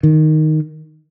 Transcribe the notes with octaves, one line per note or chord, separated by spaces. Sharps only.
D#3